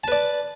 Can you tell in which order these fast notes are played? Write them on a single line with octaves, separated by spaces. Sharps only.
A5 B4 D5